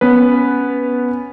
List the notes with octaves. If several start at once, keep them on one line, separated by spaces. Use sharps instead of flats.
B3 C#4 B4